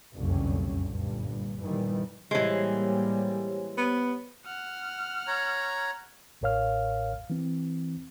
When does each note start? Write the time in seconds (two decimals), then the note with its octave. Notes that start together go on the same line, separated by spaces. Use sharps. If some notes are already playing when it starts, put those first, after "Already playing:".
0.14 F#1 C2 F2 A#2 D3 C#4
0.87 G1 G2 A#2
1.62 G1 G2 A#2 D#3 E3 G3
2.31 A2 E3 G3 G#3 A#3 G4 C5 C#5
3.78 B3
4.46 F#5 F6
5.27 C#5 A#5
6.41 A1 A2 A#4 C#5 F5 F6
7.30 E3 C4